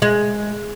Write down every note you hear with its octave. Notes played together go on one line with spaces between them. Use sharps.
G#3